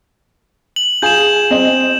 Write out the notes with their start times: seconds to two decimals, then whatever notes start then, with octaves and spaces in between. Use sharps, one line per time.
0.76 F#7
1.02 F4 G#4 G#5 G6 E7
1.51 C4 D#5